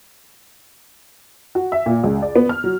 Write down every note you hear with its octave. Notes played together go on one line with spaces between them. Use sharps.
F#4
E5
A#2
C#2
D5
B3
F6
F#3